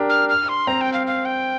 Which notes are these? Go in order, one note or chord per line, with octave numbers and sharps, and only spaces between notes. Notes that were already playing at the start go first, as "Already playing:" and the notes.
Already playing: D4 G4 A#4
F6
F6
C6
C4 A#5
G5
F5
F5
G5